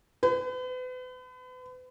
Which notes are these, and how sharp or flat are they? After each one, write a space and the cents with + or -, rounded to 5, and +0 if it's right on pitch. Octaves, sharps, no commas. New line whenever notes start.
B4 +40